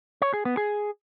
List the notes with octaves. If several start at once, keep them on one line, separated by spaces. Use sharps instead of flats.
C#5
G#4
B3
G#4